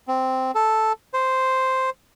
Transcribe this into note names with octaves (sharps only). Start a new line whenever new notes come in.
C4
A4
C5